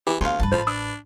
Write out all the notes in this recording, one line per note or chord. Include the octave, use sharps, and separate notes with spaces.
E3 G4
D2 B3 F5 C6
G2 G3 B4 A5
A1 F3 C5
D4 D#6 E6